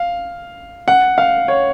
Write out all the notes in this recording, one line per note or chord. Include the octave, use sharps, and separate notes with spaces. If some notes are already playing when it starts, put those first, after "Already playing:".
Already playing: F5
F#5
F5
C#5